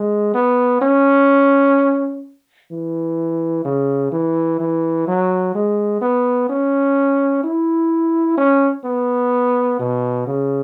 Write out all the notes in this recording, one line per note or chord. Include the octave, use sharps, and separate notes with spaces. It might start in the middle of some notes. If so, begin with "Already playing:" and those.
Already playing: G#3
B3
C#4
E3
C#3
E3
E3
F#3
G#3
B3
C#4
E4
C#4
B3
B2
C#3